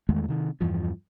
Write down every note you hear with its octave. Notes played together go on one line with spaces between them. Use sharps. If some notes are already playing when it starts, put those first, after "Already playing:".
E2 D#3 G#3 A3
C3 D#3
E2 G2 E3 F3